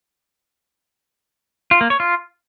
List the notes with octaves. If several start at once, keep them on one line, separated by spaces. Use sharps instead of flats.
F4
A#3
C#5
F4